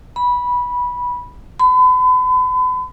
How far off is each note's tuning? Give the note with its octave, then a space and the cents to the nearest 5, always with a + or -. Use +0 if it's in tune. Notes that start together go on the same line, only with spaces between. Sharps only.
B5 -15
B5 +40